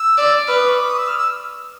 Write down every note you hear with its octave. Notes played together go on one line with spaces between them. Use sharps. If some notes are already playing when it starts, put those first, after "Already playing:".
Already playing: E6
D5
B4 F6
D#6
C#6
D6
D#6
E6
F6
E6